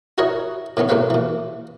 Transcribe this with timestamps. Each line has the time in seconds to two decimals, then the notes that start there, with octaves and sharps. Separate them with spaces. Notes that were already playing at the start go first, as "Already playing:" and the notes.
0.18 D#4 E4 F#4 A#4 C#5 D#5
0.77 A2 D#3 B3 C#4
0.89 B1 A2 G#3 A#3 B4 F5
1.10 A#2 E3